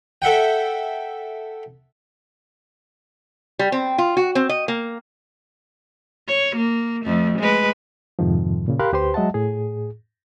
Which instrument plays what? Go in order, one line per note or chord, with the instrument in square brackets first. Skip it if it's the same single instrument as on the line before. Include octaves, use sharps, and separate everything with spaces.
[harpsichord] A4 E5 F#5 G5
[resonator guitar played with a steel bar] G3
C4
F4
F#4
C4
D#5
A#3
[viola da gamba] C#5
A#3
F2 A3
G#3 B4
[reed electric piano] F2 G#2 C3 D#3 F3
A#2 C#3
G4 A#4 F5 B5 C6 F#6
D2 G4 B4 C5 C6
F#3 G#3 D#5 E5 F#5 A5
A2 G#4